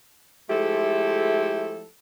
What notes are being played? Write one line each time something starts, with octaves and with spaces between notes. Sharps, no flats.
F3 G#3 A3 E4 G4 A4